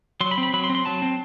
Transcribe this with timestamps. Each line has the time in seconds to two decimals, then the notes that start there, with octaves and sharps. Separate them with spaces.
0.21 F#3 C6
0.31 B5
0.38 C4
0.43 B5
0.53 F#3 B5
0.64 C6
0.70 C4
0.75 C6
0.85 F#3 A5
1.02 C4